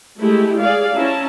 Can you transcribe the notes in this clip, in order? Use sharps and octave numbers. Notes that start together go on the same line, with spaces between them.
G#3 A3 E4 G4
G#4 D5 F5
C#4 E4 A5 A#5